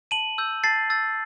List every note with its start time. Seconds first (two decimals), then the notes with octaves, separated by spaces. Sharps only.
0.11 A5 D#7 F#7
0.38 E6 G6
0.64 A5 A6 C7
0.90 E6 G6 A6